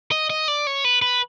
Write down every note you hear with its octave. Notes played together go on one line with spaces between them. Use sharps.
D#5
D#5
D5
C#5
B4
B4